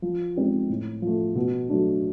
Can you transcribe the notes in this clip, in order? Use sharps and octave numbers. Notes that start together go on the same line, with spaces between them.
F3
G#3 C4 D#4 G4
A2
F3 A3
B2
F#3 A3 D4